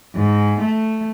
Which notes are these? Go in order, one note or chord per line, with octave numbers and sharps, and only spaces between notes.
G#2
A3